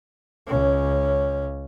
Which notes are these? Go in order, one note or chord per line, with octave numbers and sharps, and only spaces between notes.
C#2 C#4